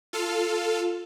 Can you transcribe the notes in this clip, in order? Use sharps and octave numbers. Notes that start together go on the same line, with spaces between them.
F4 A4 F5